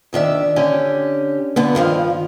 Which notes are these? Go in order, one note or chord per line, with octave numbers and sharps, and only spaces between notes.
D2 D#3 D4 E5
D3 C#4 G4
F2 D3 B3
G2 D#3 F3 F5